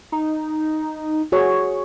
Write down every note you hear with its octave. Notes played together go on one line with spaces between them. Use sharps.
D#4
F#4 G#4 C#5